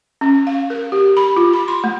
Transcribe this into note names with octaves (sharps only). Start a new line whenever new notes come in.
C#4
F5
A#4
G4
B5
F4
B5
C6
A3